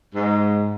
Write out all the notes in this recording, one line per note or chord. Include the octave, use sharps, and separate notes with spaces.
G#2